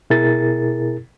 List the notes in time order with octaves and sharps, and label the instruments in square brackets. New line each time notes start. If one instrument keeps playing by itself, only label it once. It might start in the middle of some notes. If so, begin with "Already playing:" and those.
[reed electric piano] B2 E4 G#4 A#4 A6